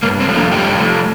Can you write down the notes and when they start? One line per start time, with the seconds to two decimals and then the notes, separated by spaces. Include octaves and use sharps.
0.03 G2 A#3
0.20 C4
0.27 F3 A3
0.36 A#3 D4
0.51 G2 D#4 G4
0.76 F3 A3